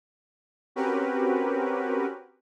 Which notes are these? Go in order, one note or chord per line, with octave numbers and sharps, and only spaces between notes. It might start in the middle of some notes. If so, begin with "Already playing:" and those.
C4 C#4 F#4 G4 A#4 B4